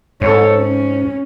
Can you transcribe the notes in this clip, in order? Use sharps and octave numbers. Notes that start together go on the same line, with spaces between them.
G#2 A4 C#5
C#4